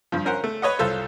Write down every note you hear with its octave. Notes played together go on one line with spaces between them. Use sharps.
G2 F3
C#4 A#4 C5 F#5
A3
B4 C#5 D#5 F#5
C2 F4 A4 C5